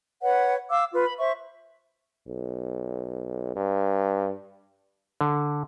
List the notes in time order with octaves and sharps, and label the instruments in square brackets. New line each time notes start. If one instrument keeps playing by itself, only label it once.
[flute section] B4 C#5 F#5
F5 D6 E6
F4 B4
B5
C5 E5 C#6
[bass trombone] B1
G2
[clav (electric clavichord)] D3